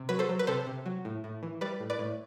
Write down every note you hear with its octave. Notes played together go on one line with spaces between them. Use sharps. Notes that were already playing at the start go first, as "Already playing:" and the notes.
Already playing: C3
F#3 B4
A4 C5
F#3
B4
C3 A4 C5
C3
F#3
A2
A2
E3
G3 B4 D5
A2
B4 D5
A2